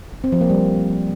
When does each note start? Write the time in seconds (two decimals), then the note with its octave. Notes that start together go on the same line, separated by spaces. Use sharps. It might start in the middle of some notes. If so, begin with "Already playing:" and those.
0.24 C4
0.32 F3
0.41 A#3
0.50 G3